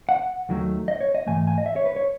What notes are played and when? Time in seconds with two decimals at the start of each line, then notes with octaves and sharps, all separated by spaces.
0.09 F#5
0.49 D#2 D#3 F#3 A3
0.88 D#5
1.01 C#5
1.15 D#5
1.27 G#2 E3 A3 G#5
1.47 G#5
1.58 D#5
1.66 E5
1.76 C#5
1.86 B4
1.96 C#5